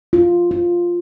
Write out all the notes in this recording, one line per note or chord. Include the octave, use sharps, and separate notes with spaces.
F4
F4